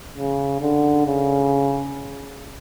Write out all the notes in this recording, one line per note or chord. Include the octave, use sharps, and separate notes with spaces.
C#3
D3
C#3